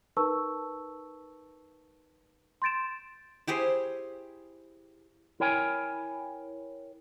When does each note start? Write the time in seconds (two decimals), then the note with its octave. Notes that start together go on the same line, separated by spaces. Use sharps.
0.17 D#4 A#4 B4 A5 C#6 E6
2.62 C6 G6 A6 D7 E7
3.48 E4 G4 G#4 C5
5.40 E4 A#4 C#5 G5 G#5